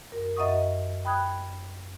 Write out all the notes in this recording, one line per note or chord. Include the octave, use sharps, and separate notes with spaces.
F#2 A#4
F#2 D#5 E5 F#5 C#6 D#6
G5 B5 D#6 F#6 G#6